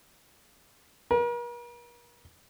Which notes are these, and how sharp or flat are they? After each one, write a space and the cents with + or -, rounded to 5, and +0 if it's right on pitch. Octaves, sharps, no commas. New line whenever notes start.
A#4 +45